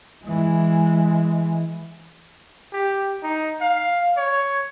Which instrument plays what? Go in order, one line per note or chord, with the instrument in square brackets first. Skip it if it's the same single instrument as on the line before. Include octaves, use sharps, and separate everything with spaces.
[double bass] E3 G#3
[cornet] G4
D#4
F5
C#5